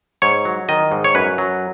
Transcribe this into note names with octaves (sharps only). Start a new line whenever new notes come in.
G#2 C#5
F#3
D#3 D#5
G#2
C#5
F#2 B4
F#3